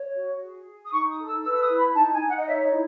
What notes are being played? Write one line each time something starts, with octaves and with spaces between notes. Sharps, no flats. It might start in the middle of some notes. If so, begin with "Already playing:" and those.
Already playing: C#5
F#4
G#4
G#4
D#6
D#4 C#6
D#6
A4
E6
B4 E6
E6
D#6
E4
B5
D#4 A5
G#5
D#4
F#5
D#5
C#5 E5
D#5
E4